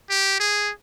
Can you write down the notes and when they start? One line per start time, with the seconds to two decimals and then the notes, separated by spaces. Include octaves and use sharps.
0.10 G4
0.40 G#4